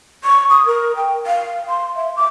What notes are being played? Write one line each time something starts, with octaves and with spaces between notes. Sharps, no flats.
C#6
D#6
A#4
G5
F5
C6
E5
D6